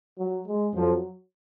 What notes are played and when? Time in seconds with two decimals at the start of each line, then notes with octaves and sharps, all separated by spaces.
0.18 F#3
0.47 G#3
0.75 F2 F3 F#3